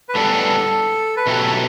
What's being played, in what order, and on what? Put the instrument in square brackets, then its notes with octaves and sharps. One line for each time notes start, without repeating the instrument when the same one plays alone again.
[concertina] B4
[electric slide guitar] A2 G3 B3 D4 [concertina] A4
[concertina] B4
[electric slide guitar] B2 F#3 A3 E4 G4 [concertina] A4